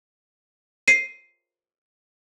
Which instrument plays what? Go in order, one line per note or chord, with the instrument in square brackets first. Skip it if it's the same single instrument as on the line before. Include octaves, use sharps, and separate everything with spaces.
[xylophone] C7 D#7